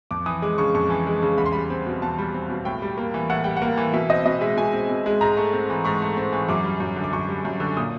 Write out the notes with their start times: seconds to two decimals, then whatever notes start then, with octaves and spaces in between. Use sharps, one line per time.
0.11 F2 D6
0.26 E3 D#6
0.42 G#3 D6
0.58 C#3 C#6
0.74 F2 C#6
0.90 E3
1.07 G#3
1.23 C#3
1.38 E2 B5
1.46 C6
1.52 G3 B5
1.70 C4
1.87 B2
2.02 E2 A5
2.18 G3
2.34 C4
2.50 B2
2.65 A2 G5
2.82 G3
2.97 A#3
3.14 E3
3.29 A2 F#5
3.44 G3 G5
3.57 F#5
3.62 A#3
3.77 E3
3.93 B2 E5
4.10 C4 D#5
4.26 B2 D#5
4.41 G#3 E5
4.57 B2 G#5
4.73 C4
4.89 B2
5.06 G#3
5.21 G#2 A#5
5.37 A3
5.53 C4
5.70 E3
5.85 G#2 C#6
6.02 A3
6.17 C4
6.32 E3
6.49 F#2 D6
6.64 G3
6.80 F#2
6.96 D3
7.04 D6
7.13 F#2 C#6
7.29 G3
7.45 F#2
7.60 D3
7.77 A#2 D#6